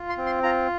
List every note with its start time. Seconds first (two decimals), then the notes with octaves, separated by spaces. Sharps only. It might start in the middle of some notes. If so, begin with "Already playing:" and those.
Already playing: F4
0.09 C6
0.17 C4
0.26 C6
0.43 F4 A#5